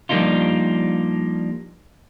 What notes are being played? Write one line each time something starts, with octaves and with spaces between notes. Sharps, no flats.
F3 G3 A#3 D4 D#4 F4